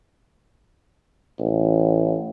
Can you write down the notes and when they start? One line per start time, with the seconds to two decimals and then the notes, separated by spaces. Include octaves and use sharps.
1.39 A1